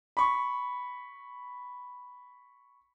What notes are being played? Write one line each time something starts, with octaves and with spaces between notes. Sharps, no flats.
B5 C#6